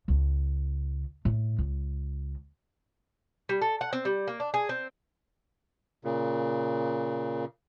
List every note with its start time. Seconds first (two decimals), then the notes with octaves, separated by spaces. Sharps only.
0.08 C#2
1.25 A2
1.58 C#2
3.49 G3
3.62 A4
3.81 F#5
3.93 C4
4.05 G3
4.28 A#3
4.40 D4
4.54 G#4
4.69 C4
6.04 A#2 C#3